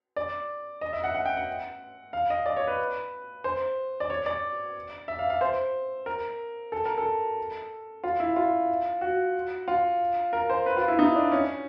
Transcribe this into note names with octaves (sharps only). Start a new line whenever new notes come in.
D5
D#5
E5
F#5
F#5
G5
F#5
F5
D#5
D5
C#5
B4
C5
D5
C#5
D5
E5
F5
F5
C5
A#4
A4
A#4
A4
F4
E4
F4
F#4
F4
A#4
C5
B4
F4
E4
D#4
D4
C#4